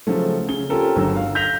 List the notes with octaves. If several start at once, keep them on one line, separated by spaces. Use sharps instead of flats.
C#3 F3 F#3 A3
C#3 G7
C4 C#4 F4 G4 A4 A#4
G1 D3 F#3 E6
F5
F6 G6 A#6 B6 F7